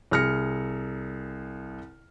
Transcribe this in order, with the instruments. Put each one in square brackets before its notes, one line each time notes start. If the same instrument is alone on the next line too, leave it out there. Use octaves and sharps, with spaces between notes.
[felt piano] C2 G#4 F6 A#6 C#7